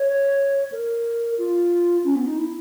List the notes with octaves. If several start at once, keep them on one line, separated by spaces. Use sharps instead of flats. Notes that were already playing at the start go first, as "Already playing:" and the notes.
Already playing: C#5
A#4
F4
C#4
B3
D#4
E4